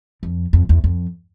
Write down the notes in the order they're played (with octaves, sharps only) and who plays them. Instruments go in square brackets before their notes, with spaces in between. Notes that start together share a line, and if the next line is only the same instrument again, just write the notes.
[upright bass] F2
F2
E2
F2